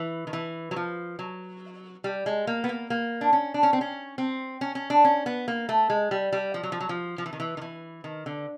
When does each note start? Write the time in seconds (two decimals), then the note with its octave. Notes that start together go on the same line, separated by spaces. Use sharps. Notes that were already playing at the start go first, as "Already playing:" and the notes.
Already playing: E3
0.27 D#3
0.33 E3
0.71 F#3
0.76 F3
1.19 F#3
2.04 G3
2.26 G#3
2.47 A#3
2.64 B3
2.69 A#3
2.90 A#3
3.21 D4
3.33 C#4
3.54 D4
3.63 C#4
3.73 C4
3.81 C#4
4.18 C4
4.61 C#4
4.75 C#4
4.90 D4
5.04 C#4
5.26 B3
5.48 A#3
5.69 A3
5.90 G#3
6.11 G3
6.32 G3
6.54 F3
6.63 F#3
6.72 F3
6.80 F#3
6.89 F3
7.18 F3
7.26 E3
7.33 D#3
7.40 E3
7.57 D#3
7.61 E3
8.04 D#3
8.26 D3